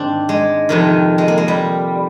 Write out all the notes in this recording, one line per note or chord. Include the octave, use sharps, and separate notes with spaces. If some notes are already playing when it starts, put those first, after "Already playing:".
Already playing: G#2 D#3 C4 D4
G#3
F2 C3 D#3
G#3
A#3
G#3
G3